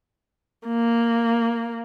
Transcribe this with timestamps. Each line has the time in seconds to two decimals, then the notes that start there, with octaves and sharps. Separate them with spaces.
0.68 A#3